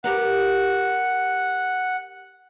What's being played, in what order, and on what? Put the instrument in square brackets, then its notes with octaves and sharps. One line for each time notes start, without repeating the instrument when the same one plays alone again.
[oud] G4 A#4 B4 [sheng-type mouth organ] F#5